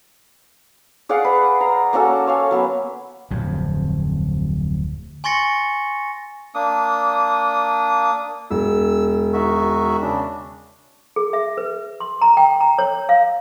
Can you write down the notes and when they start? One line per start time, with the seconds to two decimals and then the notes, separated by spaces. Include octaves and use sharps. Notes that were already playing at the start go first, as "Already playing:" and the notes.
1.09 G#4 D5 F5 F#5
1.25 B4
1.60 A#5
1.93 A#3 C#4 F#4 A4
2.27 C#5 F5 G#5
2.51 F#3 B3
3.31 D1 F2
5.24 G#5 C6 C#6 A6 A#6 C#7
6.55 A#3 D4 D#6
8.51 E1 E6
9.33 D#3 F#4 E5
10.02 C#3 D4
11.16 G#4
11.33 E5
11.57 B4
12.00 C6
12.22 A#5
12.37 G5
12.61 A#5
12.78 C#5
13.09 F5